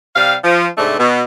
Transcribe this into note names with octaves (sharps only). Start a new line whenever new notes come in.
C3 G3 F5
F3
G#2 C3 A3 D4
B2